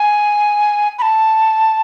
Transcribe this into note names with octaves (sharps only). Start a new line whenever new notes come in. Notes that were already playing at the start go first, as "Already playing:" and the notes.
Already playing: G#5
B5
A5